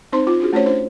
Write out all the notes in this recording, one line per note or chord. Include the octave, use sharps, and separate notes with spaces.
C4 D#4 C5 C6
F4
D4 F4 F#4 G#4
A3 C#4 E4 C5 C#5
D4 E4 C5 C#5